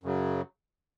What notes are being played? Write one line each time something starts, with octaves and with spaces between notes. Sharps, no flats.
F#2 C#3 F#3